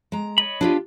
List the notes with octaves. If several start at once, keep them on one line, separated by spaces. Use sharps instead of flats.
G#3 A#5
C#5 D#5 B5
D4 F4 G4